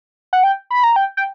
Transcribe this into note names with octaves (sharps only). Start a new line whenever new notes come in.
F#5
G5
B5
A#5
G5
G5